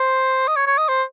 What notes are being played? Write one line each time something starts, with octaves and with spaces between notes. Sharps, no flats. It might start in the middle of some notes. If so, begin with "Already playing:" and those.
Already playing: C5
D#5
C#5
C#5
D#5
C5